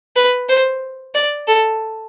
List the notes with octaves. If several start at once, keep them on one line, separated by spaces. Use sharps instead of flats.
B4
C5
D5
A4